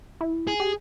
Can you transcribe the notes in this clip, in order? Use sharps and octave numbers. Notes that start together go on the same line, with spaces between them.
E4
G#4
G4